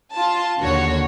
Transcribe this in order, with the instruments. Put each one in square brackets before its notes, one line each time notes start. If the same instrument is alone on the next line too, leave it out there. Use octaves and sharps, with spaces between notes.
[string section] F4 A5
D#2 D3 F#4 C#5